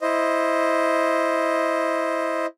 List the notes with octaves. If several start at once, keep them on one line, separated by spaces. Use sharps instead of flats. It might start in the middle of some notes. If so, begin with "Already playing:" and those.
E4 C5 D#5